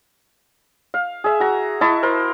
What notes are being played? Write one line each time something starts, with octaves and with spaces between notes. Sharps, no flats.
F5
G#4 E5
F#4 A#5
E4 D#5 A5 C#6
A#4 C5